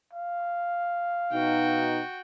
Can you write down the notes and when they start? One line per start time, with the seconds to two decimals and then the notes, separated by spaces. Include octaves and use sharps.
0.13 F5
1.33 B2 D#4 F#4 G5